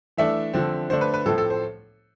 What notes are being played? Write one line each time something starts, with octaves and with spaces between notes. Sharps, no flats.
E3 A3 D4 E5
D3 F3 C4
D3 A3 D4 C5
B4
B4
A2 F3 A3 C4 A4
A4
C5